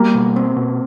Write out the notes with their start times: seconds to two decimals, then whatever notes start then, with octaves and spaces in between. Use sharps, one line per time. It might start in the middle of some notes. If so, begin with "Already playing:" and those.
Already playing: G3 A#3
0.15 B2
0.36 C4
0.56 B2